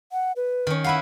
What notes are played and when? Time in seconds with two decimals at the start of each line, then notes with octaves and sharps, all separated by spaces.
0.12 F#5
0.36 B4
0.67 D#3 C#4
0.84 E4 B4 F5 F#5